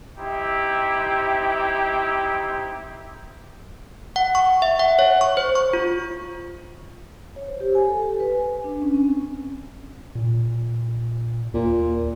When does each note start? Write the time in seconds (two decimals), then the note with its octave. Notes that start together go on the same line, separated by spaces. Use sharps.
0.18 C4 D#4 E4 G4
4.16 F#5
4.35 C#6
4.62 E5
4.79 F#5
4.99 C#5
5.21 C#6
5.37 C5
5.55 C#6
5.73 F4
7.36 C#5
7.48 C5
7.60 G4
7.75 G#5
7.88 A4
8.03 G4
8.20 B4
8.39 G#5
8.64 D4
8.82 C#4
8.94 C4
10.15 A#2
11.54 D#2 A#2